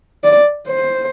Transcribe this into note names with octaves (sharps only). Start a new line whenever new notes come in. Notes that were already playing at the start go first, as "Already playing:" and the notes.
D5
C5